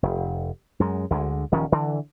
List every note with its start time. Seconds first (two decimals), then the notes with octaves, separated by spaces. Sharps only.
0.03 F1
0.80 F#2 G#3
1.10 D2 D3 G#3
1.52 D#1 D#3 F3 C#4
1.72 D3 E3